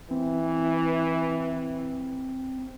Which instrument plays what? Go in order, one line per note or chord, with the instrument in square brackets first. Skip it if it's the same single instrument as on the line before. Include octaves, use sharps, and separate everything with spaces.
[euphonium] E3 [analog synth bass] C4